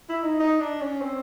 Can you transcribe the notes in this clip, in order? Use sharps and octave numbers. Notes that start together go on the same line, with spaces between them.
E4
D#4
D#4
D4
C#4
C4